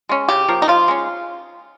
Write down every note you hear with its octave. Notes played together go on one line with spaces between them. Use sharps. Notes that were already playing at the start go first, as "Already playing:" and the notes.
G#3 C#4
C#3 G4
F3 A#3
D#4
F3 F4
G#3 C#4